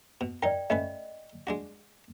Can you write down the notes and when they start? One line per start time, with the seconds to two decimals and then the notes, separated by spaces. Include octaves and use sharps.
0.21 B2
0.43 D#4 A#4 D5 G5
0.70 A3 C#4 B4 D#5
1.47 G#3 D4 F#4